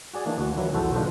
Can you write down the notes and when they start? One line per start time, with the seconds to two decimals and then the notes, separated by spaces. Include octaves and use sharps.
0.14 F#4 G#4 D5 G#5
0.26 E3 A#3 D4 D#4
0.38 D2 F#4
0.57 D#3 E3 F#3 E4
0.73 B1 E2 F#4 A4 C5
0.95 G#2 B2 D#3 F3 D4 C5